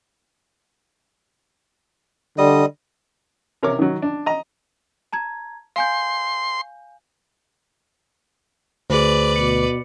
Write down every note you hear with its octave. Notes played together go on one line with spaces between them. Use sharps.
D3 G3 D#5
C3 A#4 C#5 D6
D#3 F#3
D4
D#5 A#5
A5 A#5 G#6
F5 G#5 C6 G6
D2 G#4 B4 C5 D5
B2 C#7